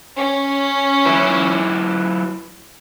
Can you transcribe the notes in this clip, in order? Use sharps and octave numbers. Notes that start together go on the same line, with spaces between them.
C#4
F#3 E4 B4